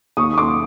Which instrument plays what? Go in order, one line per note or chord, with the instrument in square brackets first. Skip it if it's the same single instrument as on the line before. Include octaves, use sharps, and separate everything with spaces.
[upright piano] D#2 C#6 D#6
C#6
C6 D6